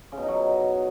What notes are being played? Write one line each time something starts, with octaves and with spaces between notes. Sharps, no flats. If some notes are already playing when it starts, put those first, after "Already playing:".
C#3
B2
D#4
F#3